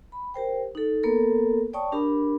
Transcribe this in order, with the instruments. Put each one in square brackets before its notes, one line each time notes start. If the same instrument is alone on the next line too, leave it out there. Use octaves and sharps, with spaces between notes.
[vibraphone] B5
G4 A#4 C5 G5
D#4 A4
A#3 B3 A4 A#4
C#5 D5 G5 A5 C#6 D#6
D4 G4 A#4 B5